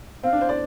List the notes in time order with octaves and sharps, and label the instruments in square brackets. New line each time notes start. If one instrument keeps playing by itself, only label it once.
[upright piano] C4 [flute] F5
[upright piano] D4
C5
D5